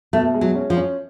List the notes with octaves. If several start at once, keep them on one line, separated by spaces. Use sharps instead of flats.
B2 A3
G#3
F#3
C#4
F3
C#4